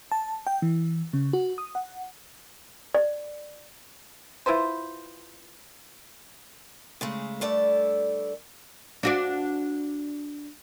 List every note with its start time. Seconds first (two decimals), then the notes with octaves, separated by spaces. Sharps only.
0.12 A5
0.47 G5
0.62 E3
1.13 C#3
1.33 F#4
1.58 D#6
1.75 F#5
2.95 D5
4.46 E4 F4 B4 C5
7.01 C#3 G#3 A3
7.41 G2 A3 A4 D5
9.03 D4 F#4 D5